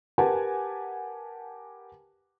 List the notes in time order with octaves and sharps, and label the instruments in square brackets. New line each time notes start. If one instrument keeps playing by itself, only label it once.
[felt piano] G4 A#4 B4 F#5 G#5 A5